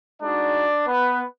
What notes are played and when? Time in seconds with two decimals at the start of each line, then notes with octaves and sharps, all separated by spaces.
0.22 G#3 D4 D#4 F#4 D5
0.88 B3 B4